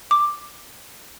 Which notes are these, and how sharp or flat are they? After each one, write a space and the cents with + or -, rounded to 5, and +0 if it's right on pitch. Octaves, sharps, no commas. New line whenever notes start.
D6 +5